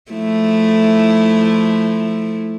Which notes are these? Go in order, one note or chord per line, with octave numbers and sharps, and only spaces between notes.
F3 A3 E4